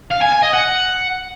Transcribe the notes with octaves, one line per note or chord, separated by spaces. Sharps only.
F5
G#5
G#5
D#5
F#5